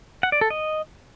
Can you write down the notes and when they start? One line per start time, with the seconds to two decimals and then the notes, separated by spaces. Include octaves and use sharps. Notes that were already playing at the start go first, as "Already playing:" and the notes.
0.23 F#5
0.32 D5
0.41 A4
0.50 D#5